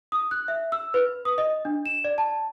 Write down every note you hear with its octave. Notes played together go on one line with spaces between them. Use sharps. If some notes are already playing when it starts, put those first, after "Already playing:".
D#6
F#6
E5
E6
B4
D#6
D#5
D4
E7
D5
A5